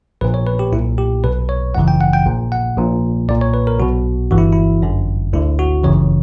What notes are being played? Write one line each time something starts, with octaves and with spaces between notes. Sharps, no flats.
A#1 A#2 B4
C#5
B4
G4
B1 A#2 E4
G4
B1 B2 B4
C#5
G1 F#2 C#3 E3 F#5
G5
F#5
G5
A#1 A#2
F#5
A#1 A#2
B1 A#2 D5
C#5
B4
A#4
B1 B2 F#4
G1 G2 E3 F#4
E4
E4
G1 F#2 D3
D2 D3 E4
F#4
G1 F#2 C#3 E3 C#5